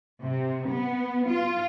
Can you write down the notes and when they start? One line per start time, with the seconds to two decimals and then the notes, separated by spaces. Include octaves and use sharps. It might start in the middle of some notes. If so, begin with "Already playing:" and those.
0.23 C3
0.68 B3
1.28 F4